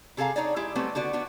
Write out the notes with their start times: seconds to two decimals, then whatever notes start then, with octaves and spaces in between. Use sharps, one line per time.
0.17 C3 G#4 A4 F5 A#5
0.36 D4 D#4 C#5 D5
0.56 G#3 E4 G4
0.75 F#3 G3 A3 B3 C4
0.95 D3 B3 F#4 D5
1.13 B3 D4 F#4